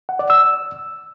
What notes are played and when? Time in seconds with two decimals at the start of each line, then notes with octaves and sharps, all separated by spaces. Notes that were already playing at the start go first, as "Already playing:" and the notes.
0.09 F#5
0.19 D5
0.30 E6